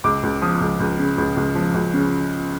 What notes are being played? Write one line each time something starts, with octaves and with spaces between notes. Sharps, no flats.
C#2 D6
C#2
F3 D#6
C#2
C#2
C#3
C#2
C#2
F3
C#2
C#3